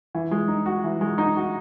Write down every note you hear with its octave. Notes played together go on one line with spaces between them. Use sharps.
E3
G#3
D#4
F#4
E3
G#3
D#4
F#4